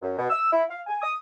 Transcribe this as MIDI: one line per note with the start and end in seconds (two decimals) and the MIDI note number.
0.02 0.15 42
0.18 0.26 47
0.30 0.50 88
0.53 0.63 64
0.70 0.82 77
0.87 1.00 80
1.02 1.14 87